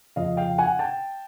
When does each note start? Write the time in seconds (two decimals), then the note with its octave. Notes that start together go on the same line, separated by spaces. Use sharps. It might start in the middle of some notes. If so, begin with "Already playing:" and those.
0.16 F2 C#3 F3 D#5 F5
0.37 F5 G5
0.58 F#5 G#5
0.79 G5 A5